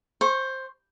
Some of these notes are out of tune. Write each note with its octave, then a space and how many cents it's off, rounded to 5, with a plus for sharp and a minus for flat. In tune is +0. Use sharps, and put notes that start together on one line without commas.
C5 +10 C#6 -15